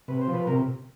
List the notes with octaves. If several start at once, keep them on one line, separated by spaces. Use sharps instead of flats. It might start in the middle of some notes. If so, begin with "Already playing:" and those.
C3 B4
C5
F3
B4
C3 A#4